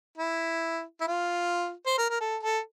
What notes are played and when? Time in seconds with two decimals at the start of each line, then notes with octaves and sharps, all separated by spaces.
0.18 E4
1.01 E4
1.07 F4
1.86 C5
1.98 A#4
2.10 A#4
2.20 A4
2.43 A4